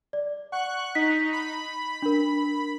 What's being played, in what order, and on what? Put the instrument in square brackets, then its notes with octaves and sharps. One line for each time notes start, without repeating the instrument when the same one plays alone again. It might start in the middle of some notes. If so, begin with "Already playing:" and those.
[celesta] D5
[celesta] F#5 [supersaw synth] C#6 F#6
[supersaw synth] D#4 [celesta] B6
[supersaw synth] B5
[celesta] D4 A#4